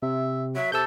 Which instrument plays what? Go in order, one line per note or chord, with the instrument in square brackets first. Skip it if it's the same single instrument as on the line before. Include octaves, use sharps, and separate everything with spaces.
[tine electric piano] C3 [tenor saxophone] E5
[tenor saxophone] F#3 [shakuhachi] E5
[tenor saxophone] C3 [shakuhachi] A4 [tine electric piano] E6 G6